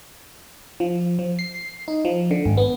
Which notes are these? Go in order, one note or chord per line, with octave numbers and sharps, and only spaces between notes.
F3
F3
C7
D#4
F3
D3
G#1
B3